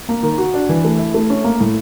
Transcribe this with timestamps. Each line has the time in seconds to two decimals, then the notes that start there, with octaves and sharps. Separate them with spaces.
0.09 A#3
0.23 D#3
0.38 F#4
0.54 D4
0.69 E3
0.84 A3
0.98 E4
1.14 A3
1.30 C#4
1.44 A#3
1.60 A2